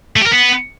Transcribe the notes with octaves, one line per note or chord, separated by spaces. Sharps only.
A3
G4
A#4
B3